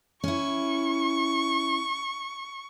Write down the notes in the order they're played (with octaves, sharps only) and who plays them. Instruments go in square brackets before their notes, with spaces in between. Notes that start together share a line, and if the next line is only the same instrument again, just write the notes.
[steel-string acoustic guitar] C#4 E4 [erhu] C#6